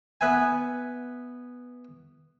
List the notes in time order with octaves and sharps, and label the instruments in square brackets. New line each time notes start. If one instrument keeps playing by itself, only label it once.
[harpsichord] B3 B4 E5 G#5